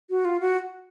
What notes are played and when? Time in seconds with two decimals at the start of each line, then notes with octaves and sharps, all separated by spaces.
0.10 F#4
0.25 F4
0.40 F#4